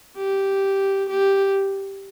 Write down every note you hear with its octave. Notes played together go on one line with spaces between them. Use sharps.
G4
G4